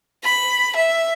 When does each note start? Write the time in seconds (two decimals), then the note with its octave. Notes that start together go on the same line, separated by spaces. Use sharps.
0.24 B5
0.76 E5